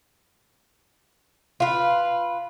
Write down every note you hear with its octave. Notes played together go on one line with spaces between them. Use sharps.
F4 B4